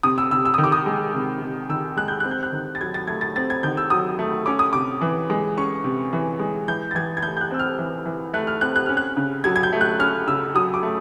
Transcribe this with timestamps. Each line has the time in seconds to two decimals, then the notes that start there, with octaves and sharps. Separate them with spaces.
0.03 C3 D#6
0.18 E6
0.31 C3 E6
0.45 E6
0.54 D#6
0.58 D#3
0.64 D6
0.72 D#6
0.86 G#3
1.14 C3
1.42 C3
1.69 D#3 E6
1.97 G#3 F#6
2.08 G6
2.20 C4 F#6
2.31 G6
2.43 F#6
2.52 D#3
2.75 A6
2.81 F#3 G#6
2.94 A6
3.07 A3 G#6
3.21 A6
3.36 C4 A6
3.50 G#6
3.63 D#3 G6
3.77 E6
3.90 F#3 D#6
4.19 A3
4.46 C#4 D6
4.59 D#6
4.73 C3 D6
5.01 E3
5.30 G#3
5.57 C#4 C#6
5.84 C3
6.13 E3
6.39 G#3
6.68 E3 G6
6.91 A6
6.95 E3 G#6
7.17 G#6
7.23 A3 G6
7.37 G6
7.41 F#6
7.51 C4 E6
7.59 F6
7.78 E3
8.06 E3
8.34 A3 F#6
8.47 F6
8.61 C4 F#6
8.76 F#6
8.86 C#4 F6
8.97 F#6
9.17 C#3
9.44 F#3 G#6
9.56 G#6
9.63 G6
9.73 A3
9.81 F#6
9.99 C#4 F6
10.27 C#3 E6
10.55 F#3 D#6
10.74 D6
10.83 A3